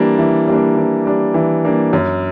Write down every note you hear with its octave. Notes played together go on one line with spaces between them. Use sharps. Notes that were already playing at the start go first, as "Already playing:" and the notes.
Already playing: E3 G3 A#3 D4
E3
G3 A#3 D4
E3
G3 A#3 D4
E3
G3 A#3 D4
F#2